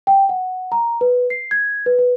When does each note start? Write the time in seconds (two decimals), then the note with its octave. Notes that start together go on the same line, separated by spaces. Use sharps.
0.07 G5
0.29 F#5
0.72 A#5
1.01 B4
1.30 C7
1.51 G#6
1.86 B4
1.99 B4